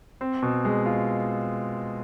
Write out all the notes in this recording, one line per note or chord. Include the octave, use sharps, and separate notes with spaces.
C4
B2
G#3
F4